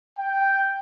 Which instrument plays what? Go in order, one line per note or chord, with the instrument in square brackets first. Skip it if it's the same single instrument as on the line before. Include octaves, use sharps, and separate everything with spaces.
[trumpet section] G5